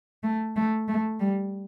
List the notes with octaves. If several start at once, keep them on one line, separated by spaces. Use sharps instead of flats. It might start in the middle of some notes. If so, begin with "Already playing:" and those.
A3
A3
A3
G3